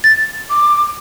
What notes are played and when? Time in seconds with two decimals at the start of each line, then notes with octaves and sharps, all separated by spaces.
0.04 A6
0.50 D6